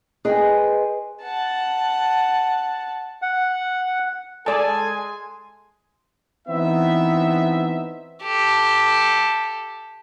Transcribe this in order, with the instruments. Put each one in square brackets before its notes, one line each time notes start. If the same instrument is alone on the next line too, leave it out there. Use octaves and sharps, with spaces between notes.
[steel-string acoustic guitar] G#4 B4 C5 D#5 G5 G#5
[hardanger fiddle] F#5 A5
[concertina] F#5
[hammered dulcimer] G#3 [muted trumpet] A4 [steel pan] D5 A5 [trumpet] G#5
[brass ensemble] E3 B3 C4 D#4 E5
[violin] G4 A4